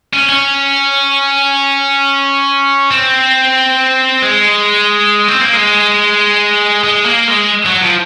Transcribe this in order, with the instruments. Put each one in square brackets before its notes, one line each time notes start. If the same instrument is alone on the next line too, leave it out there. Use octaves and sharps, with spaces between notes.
[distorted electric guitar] C#4
C#4
C4
G#3
C4
A#3
G#3
G#3
A#3
G#3
F#3
F3